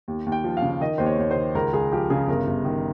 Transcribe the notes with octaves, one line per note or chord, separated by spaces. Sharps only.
D#2
D#2
G5
F3
F5
C#3
D#3 D#5
D#2 C5
C#5
D#2 C#5
C5
D#3
C#2 A#4
C#2 G#4
F3 G4
C#3 G#4
G1 A#4
G1
D#3